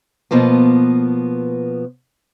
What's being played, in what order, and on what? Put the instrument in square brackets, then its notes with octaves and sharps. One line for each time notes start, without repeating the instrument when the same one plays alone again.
[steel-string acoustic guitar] B2 F3 A#3 B3